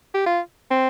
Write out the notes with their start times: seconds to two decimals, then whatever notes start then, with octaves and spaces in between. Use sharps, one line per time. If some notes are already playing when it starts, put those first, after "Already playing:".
0.14 G4
0.26 F4
0.71 C4